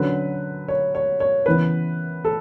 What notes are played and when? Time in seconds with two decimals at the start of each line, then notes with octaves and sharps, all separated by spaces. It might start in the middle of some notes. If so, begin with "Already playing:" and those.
Already playing: D3 F#3 C#4 B4
0.68 C#5
0.95 C#5
1.20 C#5
1.46 C#3 E3 B3 B4
2.25 A4